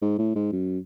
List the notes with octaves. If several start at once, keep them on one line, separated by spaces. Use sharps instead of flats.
G#2
A2
G#2
F#2